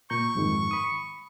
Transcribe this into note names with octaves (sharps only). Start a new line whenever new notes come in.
A#2 A#5 C#6 G6
F2 G#2 D#3
B5 D#6